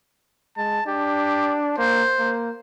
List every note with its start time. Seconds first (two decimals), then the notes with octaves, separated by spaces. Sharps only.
0.57 G#3 A5
0.87 D4 G4
1.78 A#3 C5
2.19 A#3